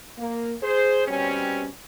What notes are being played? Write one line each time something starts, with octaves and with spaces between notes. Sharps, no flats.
A#3
G#4 C5
B2 G3 C4 C#4